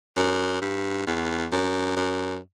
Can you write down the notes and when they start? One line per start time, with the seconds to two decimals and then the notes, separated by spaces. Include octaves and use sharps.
0.17 F#2
0.62 G2
1.07 E2
1.52 F#2
1.97 F#2